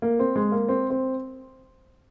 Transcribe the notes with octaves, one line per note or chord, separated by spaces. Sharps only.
A#3
C4
G#3
A#3
C4
C4